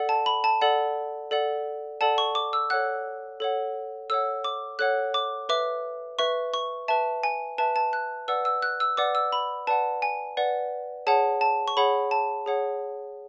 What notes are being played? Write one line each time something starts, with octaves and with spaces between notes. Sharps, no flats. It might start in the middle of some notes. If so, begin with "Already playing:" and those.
Already playing: A4 D5 F#5
A5
B5
A5
A4 D5 F#5
A4 D5 F#5
A4 D5 F#5 A5
C#6
D6
E6
A4 C#5 F#5 F#6
A4 C#5 F#5
A4 C#5 F#5 E6
D6
A4 C#5 F#5 F#6
D6
B4 E5 D6
B4 E5 C#6
C#6
B4 E5 A5
G#5
B4 E5 A5
A5
F#6
B4 D5 F#5 E6
E6
F#6
E6
B4 D5 F#5 D6
E6
B5
B4 D5 F#5 A5
G#5
B4 D5 F#5
G#4 C#5 F#5 A5
A5
C#6
G#4 C#5 F#5 B5
A5
G#4 C#5 F#5